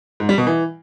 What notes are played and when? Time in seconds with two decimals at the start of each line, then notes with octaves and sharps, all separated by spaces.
0.20 G#2
0.29 G3
0.38 B2
0.47 E3